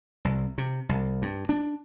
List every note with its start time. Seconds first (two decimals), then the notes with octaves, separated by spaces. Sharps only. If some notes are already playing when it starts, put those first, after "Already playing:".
0.25 C2
0.58 C3
0.89 C2
1.22 G2
1.49 D4